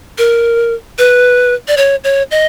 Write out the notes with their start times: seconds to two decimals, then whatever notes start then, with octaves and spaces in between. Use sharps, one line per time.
0.18 A#4
0.99 B4
1.68 D5
1.77 C#5
2.04 C#5
2.31 D#5